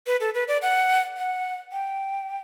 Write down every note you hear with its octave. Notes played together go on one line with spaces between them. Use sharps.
B4
A4
B4
D5
F#5
F#5
G5